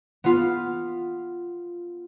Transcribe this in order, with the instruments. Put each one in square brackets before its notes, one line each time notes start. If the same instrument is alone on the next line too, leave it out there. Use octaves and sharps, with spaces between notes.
[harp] B3 F4